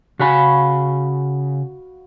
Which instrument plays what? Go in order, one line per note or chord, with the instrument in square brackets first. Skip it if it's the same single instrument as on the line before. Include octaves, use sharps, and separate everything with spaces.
[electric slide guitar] C#3 G#5 [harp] F#4 F5 B5